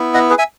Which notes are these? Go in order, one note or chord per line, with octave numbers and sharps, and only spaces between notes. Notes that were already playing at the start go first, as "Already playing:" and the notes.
Already playing: B3 E4
D#5 F#5
G#4 B4
E5 G#5